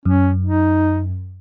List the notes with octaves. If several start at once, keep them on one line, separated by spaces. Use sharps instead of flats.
F#2 C#4
D#4